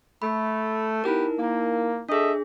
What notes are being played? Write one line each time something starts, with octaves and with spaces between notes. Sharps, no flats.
A3 B5
B3 D#4 E4 G4 A#4 B4
A#3
D4 G#4 A4 D#5 E5